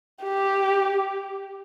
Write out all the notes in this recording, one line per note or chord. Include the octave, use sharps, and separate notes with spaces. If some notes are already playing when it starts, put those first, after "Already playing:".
G4